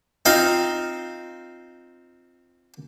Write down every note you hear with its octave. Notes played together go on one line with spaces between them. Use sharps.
C4 D#4 F4 F5